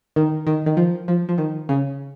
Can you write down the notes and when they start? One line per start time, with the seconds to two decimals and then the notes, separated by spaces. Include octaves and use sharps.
0.16 D#3
0.47 D#3
0.66 D#3
0.77 F3
1.08 F3
1.29 F3
1.38 D#3
1.69 C#3